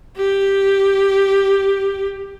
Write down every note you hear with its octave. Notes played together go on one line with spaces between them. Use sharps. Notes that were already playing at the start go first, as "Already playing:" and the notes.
G4